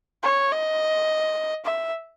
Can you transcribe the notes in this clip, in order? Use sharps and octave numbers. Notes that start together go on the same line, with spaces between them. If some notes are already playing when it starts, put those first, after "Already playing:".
C#5
D#5
E5